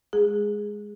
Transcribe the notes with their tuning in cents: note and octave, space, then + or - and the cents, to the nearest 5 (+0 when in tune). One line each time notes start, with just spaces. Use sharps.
G#3 +0 G#4 +0